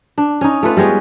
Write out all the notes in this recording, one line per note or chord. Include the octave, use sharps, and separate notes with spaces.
D4
C#4 D#4
A3 F4 B4
G3 G#3 B3 C#4